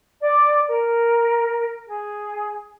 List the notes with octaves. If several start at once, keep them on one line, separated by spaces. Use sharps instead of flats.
D5
A#4
G#4